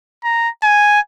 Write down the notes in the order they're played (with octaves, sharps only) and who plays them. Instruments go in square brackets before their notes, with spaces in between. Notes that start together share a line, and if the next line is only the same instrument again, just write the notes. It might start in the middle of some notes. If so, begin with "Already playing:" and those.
[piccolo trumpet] A#5
G#5